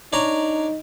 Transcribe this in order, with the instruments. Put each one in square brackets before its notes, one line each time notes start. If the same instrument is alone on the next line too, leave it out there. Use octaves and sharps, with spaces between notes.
[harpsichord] D4 C#5 A#5 [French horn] D#4